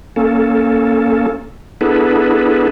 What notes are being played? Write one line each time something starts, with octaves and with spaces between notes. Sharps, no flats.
A#3 C#4 A4
B3 D4 E4 G#4 A4 B4